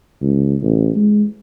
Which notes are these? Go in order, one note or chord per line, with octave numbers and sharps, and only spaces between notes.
C#2
A1
G#3